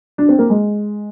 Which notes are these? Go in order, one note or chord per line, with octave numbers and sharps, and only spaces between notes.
D4
C4
A#3
G#3